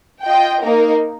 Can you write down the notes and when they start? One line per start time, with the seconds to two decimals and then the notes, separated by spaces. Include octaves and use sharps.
0.24 F4 D#5 G5
0.61 A#3 D#4 A#4